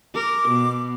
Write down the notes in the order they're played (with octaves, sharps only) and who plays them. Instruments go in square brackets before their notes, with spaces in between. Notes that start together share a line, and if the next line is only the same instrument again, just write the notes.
[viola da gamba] A#4 [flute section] D6
[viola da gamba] B2